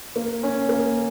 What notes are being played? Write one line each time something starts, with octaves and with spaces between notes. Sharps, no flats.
A#3
C#4
A#3